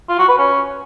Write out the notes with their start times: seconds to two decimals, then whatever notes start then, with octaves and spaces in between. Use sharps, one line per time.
0.09 F4
0.18 F#4
0.28 B4
0.38 C#4